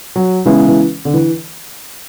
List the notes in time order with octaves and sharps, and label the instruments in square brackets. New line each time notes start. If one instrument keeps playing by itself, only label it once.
[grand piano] F#3
[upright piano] C#3 G#3 B3 E4 [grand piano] E3
[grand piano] E3
D3
E3